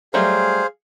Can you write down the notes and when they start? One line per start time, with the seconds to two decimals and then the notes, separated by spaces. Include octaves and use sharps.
0.14 F#3 G3 A3 G#4 C5 F5